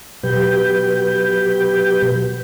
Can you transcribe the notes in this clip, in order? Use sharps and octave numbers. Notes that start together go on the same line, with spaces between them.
B2 F#3 G4 B4 G6